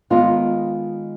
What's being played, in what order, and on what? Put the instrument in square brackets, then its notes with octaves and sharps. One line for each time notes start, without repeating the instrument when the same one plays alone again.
[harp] D#3 G#3 B3 [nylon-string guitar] F4